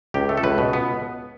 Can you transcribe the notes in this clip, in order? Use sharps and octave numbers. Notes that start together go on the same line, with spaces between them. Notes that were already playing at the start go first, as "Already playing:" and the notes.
C#2 G4
A3
A4
C#2 B4
B2
B3